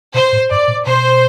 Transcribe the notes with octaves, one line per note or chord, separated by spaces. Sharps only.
B2 C5
A2
G2 D5
A#2
B2 C5